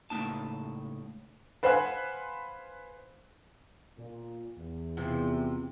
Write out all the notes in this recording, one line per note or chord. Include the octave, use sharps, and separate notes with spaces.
C#2 A2 C3 A#3 D#4 A5
B4 C5 F5 F#5 G#5 F#6
A#2
E2
C3 E3 F3